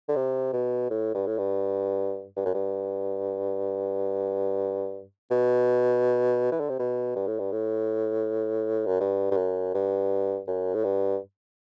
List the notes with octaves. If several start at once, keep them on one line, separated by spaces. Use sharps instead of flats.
D3
C3
B2
A2
G2
A2
G2
G2
F#2
G2
B2
E3
D3
C3
B2
G2
A2
G2
A2
F#2
G2
G2
F#2
G2
F#2
A2
G2